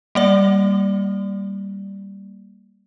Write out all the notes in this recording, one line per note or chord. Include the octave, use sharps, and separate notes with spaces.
G3 A#3 D5